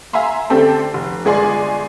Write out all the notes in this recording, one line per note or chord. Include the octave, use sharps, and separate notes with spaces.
E5 F5 G#5 A#5 C6
D3 A3 C4 G4 A4
F1
G1 G#3 G#4 D5 G#5 C6